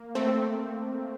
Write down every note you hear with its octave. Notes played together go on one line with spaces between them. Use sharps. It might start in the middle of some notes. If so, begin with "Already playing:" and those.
Already playing: A#3
A3 C4